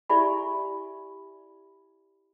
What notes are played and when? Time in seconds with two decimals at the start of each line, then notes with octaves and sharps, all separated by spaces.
0.09 E4 G4 D5 E5 G#5 B5